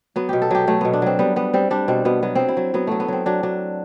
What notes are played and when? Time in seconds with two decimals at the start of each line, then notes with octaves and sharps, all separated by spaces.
0.16 F#3 B3
0.29 B2 G4
0.42 A4
0.51 F#3 G4
0.67 F#3 A3
0.81 B2 B3
0.93 D4
1.02 F#3 C4
1.19 G3 B3
1.36 G3 B3
1.54 G3 C4
1.71 G3 D4
1.88 B2 C4
2.05 B2 B3
2.22 F#3 B3
2.35 F#3 C4
2.48 E4
2.57 F#3
2.74 F#3 B3
2.87 F#3 A3
3.00 B3
3.08 F#3 C4
3.26 F#3 D4
3.43 F#3 D4